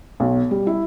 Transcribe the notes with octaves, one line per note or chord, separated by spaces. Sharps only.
B1
G3
E4